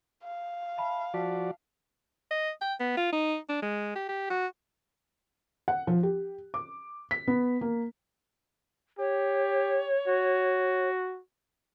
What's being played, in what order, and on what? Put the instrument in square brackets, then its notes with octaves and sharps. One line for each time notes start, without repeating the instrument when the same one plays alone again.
[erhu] F5
[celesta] E5 A5 B5
[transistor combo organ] F3 F#4 D5 [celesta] A5 B6
[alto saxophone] D#5
G5
B3
F4
D#4
D4
G#3
G4
G4
F#4
[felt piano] F#5
F3
G4
D6
B6
B3
A#3
[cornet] G4 [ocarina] C#5
[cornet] F#4